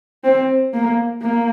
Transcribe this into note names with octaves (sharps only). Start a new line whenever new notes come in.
C4
A#3
A#3